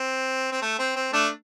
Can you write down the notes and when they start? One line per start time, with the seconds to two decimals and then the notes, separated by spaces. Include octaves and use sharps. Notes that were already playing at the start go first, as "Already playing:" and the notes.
Already playing: C4
0.52 C4
0.62 A3
0.79 C4
0.96 C4
1.13 A3 D4